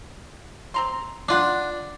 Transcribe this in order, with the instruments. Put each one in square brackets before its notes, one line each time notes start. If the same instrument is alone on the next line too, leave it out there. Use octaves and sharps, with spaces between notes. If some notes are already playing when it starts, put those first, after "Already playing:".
[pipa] C4 A#5 C6
[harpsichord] D4 [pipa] D#4 F4 F#5